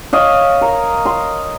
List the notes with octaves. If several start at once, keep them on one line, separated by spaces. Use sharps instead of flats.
C#5 D#5 F5
A#4
C6